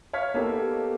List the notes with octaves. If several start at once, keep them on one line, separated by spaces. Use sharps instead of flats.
C#5 F5 F6 B6
A#3 B3 D#4 G4 A4